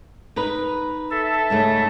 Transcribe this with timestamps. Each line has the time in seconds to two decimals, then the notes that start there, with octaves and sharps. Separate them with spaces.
0.36 D#4 B4
1.11 A4 E5 A5
1.50 G#2 C#3 A3